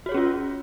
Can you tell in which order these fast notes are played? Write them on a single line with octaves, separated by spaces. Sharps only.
F#4 C#5 G#4 C#4 F4